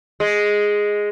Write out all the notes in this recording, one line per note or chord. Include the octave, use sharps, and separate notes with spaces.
G#3